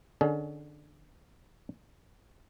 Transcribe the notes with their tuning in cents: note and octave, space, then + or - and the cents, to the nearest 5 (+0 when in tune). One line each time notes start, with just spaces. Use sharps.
D3 +25 C#4 +25 G#4 +45